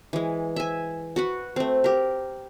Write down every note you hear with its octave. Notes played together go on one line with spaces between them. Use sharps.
E3 G#3
E5 G#5
F#4 B4 F#5
A3 C4
G4 A#4